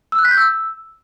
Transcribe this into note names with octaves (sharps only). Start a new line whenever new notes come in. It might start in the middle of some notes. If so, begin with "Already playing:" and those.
E6
F#6
B6
G6
E6